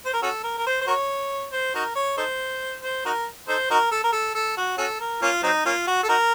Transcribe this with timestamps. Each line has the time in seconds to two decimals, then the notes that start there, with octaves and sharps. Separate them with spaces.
0.06 C5
0.13 A#4
0.23 C#4 F#4 A4
0.44 A#4
0.58 A#4
0.67 C5
0.81 C5
0.87 F#4 A#4 C#5
1.53 C5
1.75 D#4 F#4 A#4
1.96 C#5
2.17 D#4 A4 C5
2.83 C5
3.05 D#4 F#4 A#4
3.48 D#4 A4 C5
3.70 D#4 F#4 A#4
3.92 A4
4.04 A#4
4.13 A4
4.35 A4
4.57 F#4
4.78 C#4 F#4 A4
5.00 A#4
5.22 A#3 C#4 F4
5.43 F#3 C4 D#4
5.66 A#3 C#4 F4
5.87 F#4
6.03 A4
6.09 D#4 F#4 A#4